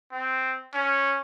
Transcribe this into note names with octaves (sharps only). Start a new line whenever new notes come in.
C4
C#4